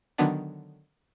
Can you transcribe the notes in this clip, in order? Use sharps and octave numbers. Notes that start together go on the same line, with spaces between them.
D3 D#3 F#3 B3 D4